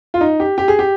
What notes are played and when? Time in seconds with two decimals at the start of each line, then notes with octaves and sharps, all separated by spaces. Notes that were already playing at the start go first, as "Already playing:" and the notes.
0.14 F4
0.21 D#4
0.40 G4
0.58 G4
0.68 G#4
0.79 G4